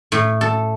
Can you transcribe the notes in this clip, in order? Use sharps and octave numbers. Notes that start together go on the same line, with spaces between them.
A2
A4